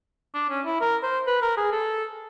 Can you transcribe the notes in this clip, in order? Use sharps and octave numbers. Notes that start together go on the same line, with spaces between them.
D4
C#4
E4
A#4
C5
B4
A#4
G#4
A4